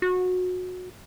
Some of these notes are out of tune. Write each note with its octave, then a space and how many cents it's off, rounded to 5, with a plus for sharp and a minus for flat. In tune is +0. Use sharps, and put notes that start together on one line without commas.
F#4 -20